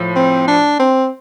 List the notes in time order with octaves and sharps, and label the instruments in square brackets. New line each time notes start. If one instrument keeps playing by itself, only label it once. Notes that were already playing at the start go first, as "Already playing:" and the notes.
Already playing: [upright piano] A2 F3
[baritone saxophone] C4
D4
C4